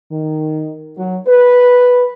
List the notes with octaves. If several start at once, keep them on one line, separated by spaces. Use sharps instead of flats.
D#3
F#3
B4